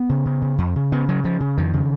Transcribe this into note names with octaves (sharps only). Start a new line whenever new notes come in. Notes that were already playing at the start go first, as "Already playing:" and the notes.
Already playing: B3
C#3
C#3
C#3
F2
C#3
C#3 B3
C#3 F#3
C#3 F3
C#3
F2 D#3
C#3